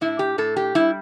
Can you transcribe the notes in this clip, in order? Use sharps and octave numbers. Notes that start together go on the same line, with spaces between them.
A2 E4
G4
A2 A4
G4
G3 E4